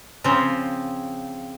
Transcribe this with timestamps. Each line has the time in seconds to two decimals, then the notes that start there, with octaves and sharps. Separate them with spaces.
0.24 C#3 F3 C4